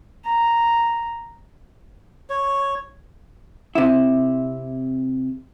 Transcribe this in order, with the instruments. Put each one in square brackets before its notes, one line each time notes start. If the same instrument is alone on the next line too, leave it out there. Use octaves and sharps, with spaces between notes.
[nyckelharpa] A#5
[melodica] C#5
[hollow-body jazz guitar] C3 E4